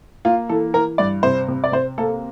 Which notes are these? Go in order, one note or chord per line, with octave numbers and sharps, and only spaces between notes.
A#3 F4
E3 A4
E3 A#4
G2 D5
C3 C5
C3
D5
C3 C5
A#3 A4